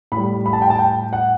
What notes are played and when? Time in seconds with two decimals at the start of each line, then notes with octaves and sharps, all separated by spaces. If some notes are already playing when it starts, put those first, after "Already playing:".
0.12 A2 B5
0.17 G3
0.46 B5
0.53 A5
0.62 G5
0.70 A5
0.79 G5
1.13 F#5